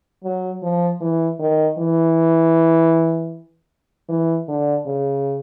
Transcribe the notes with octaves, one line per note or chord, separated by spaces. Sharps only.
F#3
F3
E3
D#3
E3
E3
D3
C#3